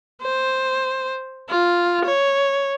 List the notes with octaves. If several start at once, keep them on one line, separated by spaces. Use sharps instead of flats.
C5
F4
C#5